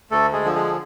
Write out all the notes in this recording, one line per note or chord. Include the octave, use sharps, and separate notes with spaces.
D2 A3 A4
G#3 G#4
D3 F3
G#3 G#4